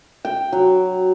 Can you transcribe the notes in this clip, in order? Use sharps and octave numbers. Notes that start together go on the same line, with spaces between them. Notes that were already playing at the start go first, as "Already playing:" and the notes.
G5
F#3